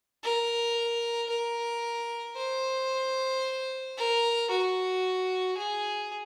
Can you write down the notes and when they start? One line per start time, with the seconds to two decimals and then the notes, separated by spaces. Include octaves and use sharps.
0.24 A#4
1.30 A#4
2.36 C5
3.97 A#4
4.50 F#4
5.58 G#4